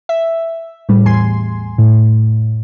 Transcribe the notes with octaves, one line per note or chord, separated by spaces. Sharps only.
E5
A2 G3
E2 G#5 C6
A2